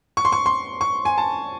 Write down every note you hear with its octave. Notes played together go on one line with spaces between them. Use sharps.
C#6
C6
C#6
C6
C#6
G#5
A5